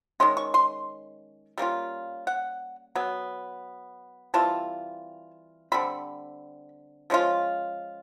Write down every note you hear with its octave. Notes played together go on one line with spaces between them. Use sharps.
D#3 G#3 C#4 C6
C#6
C6
G3 A#3 C#4 F4
F#5
F#3 B3
E3 G3 C4 F4 A5
D3 G3 C4 B5
F3 G#3 C#4 F4